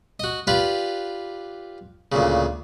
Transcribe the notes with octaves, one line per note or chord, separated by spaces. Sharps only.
F#4 D#5
F4 G4 B4 D5
D2 A#2 C#3